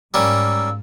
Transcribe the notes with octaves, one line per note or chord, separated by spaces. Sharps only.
G#2 G3 A#3 C#4 E6